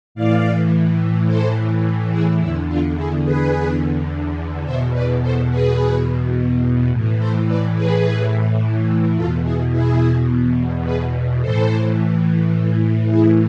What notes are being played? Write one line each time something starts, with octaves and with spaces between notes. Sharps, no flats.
A2 E3 D5 F5
A4 C5
E4 G#4
E2 D3 E4
D4 F4
E4 G#4
G#4 B4
B2 C5 E5
E2
B4 D5
A4 C5
G#4 B4
A2 E3
A4 C5
B4 D5
G#4 B4
E2 B2 F4 A4
E4 G#4
E4 G#4
G#4 B4
A2 E3 A4 C5
E4 G#4